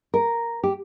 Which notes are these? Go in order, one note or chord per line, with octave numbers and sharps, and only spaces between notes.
A#4
G4